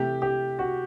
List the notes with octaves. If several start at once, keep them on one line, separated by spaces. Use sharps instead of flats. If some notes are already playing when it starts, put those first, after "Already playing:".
Already playing: C3 E3 A3 G4
G4
F#4